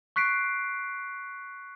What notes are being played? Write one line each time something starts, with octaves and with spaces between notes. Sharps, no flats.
C#6 F#6 B6 C7 D7